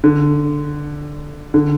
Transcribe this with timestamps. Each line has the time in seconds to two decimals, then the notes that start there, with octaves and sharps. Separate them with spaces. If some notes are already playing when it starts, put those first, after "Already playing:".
0.04 D3
1.54 D3